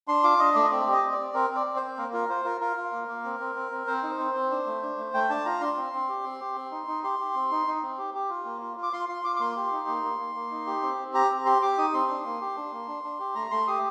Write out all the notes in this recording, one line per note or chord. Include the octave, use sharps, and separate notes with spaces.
D4 C6
F4 D6
D4 D#5
A3 D5
D#5
C4 D5
G4 D#5
C4
D5
C4
C4 A#4
C4
D5
C4
C5
C4
A#3 A#4
F4 A#4
F4 C5
F4 A#4
F4 A#4
F4
A#3
A#3
C4
C4
C4
C4
C4 C5
D#4
C4
C4
D4
A3
D4
A3
A3 G5
D4 A5
F4 A#5
D4 C6
C4
C4
G4
C4
G4
C4
D#4
D#4
G4 C6
G4
C4
D#4
D#4
C4
G4
G4
F4
A#3
F4
F4
D6
F4 C6
F4 C6
F4 D6
D6
A#3 C6
G4
D#4
A#3
A#3
A#3
A#3
D#4
G4
C4
C4
G4 A#5
C4
G4 C6
G4 D6
D#4 D#6
C4 C6
D4
A#3
G4
D4
A#3
D4
D4
G4
A3 A#5
A3 C6
G4 D#6